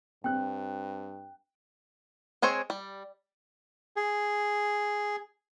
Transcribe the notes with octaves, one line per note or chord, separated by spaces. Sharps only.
G2 C4 G5 F#6
G#3 C4 G#4 C5 C#5
G3
G#4